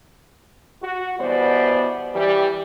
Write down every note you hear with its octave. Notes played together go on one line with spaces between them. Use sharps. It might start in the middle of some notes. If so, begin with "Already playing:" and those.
F#4
B2 E3 G3 B3 C5 D5
E3 G3